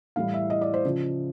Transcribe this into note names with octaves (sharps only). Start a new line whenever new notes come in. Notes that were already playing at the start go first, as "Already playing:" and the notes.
A2 E3 G3 F5
E5
D#5
D5
C5
C#3 F3